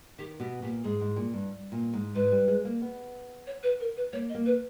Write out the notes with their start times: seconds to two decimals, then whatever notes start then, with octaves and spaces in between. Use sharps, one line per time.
0.19 D#3 G4
0.40 B2 G4
0.62 A#2 G4
0.84 G#2 G#4
1.01 G#2
1.16 A#2
1.33 G2
1.72 A#2
1.94 G#2
2.15 G#2 B4
2.32 G3
2.48 G#3
2.65 A#3
2.82 B3
3.47 C#5
3.63 B4
3.80 A#4
3.96 B4
4.13 A#3 C#5
4.29 D#5
4.35 A#3
4.46 B4